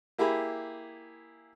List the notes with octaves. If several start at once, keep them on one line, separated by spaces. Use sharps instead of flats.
A#3 E4 G4 G#4 B5